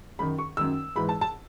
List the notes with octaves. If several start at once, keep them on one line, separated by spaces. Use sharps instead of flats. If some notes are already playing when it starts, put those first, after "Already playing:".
F#2 D#3 B5
C#6
F#2 D#3 E6
G#2 E3 B5
A5
A5